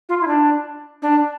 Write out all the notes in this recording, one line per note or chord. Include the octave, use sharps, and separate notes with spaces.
F4
E4
D4
D4